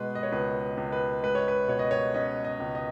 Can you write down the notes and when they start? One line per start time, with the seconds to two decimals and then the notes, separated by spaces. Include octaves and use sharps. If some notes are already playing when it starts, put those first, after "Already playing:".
Already playing: B2 G#3 B4
0.15 D#5
0.23 C#5
0.32 C#2 B4
0.77 C#2
0.92 B4
1.23 G#3 B4
1.35 C#5
1.48 B4
1.68 B2 C#5
1.79 D#5
1.91 C#5
2.14 C#4 D#5
2.45 D#5
2.60 C#2
2.75 D#5